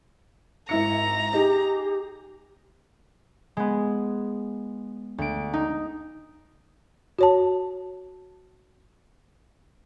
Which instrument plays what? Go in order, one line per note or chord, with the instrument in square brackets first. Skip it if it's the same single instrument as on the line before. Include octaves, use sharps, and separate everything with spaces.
[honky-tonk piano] G#1 E4 C#7 [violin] A#5
[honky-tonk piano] D#4 G#4 [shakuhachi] G4
[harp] G#3 B3
D2 D7
D#4
[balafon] F#4 C#5 A5